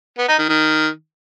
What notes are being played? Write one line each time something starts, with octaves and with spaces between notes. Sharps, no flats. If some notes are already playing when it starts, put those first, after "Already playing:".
B3
D#4
D#3
D#3